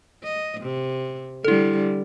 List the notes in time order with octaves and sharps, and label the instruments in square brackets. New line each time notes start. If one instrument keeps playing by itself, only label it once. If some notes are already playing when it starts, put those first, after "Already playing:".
[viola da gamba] D#5
C3
[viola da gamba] D3 G3 [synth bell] E4 A4